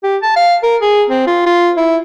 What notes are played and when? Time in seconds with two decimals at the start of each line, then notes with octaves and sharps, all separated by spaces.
0.04 G4
0.23 A5
0.36 F5
0.63 A#4
0.82 G#4
1.10 C4
1.27 F4
1.46 F4
1.77 E4